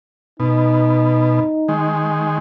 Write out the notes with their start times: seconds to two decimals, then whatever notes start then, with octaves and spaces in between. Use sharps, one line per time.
0.40 B2 D#4
1.69 D#3 G#3